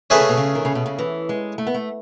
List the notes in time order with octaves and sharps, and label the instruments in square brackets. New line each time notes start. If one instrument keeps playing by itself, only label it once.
[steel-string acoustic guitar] D#3 [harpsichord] A3 C#4 G#4 B4 E5
[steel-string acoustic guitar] C#3
B2
C#3
D#3
C#3
B2
C#3
E3
G#3
A3
B3
A3